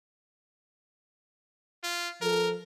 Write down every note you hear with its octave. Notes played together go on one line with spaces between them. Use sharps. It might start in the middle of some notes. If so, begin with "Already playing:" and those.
F4
F3 A4 A#4